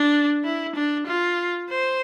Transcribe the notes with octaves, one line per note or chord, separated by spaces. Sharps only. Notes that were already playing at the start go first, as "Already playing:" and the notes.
Already playing: D4
E4
D4
F4
C5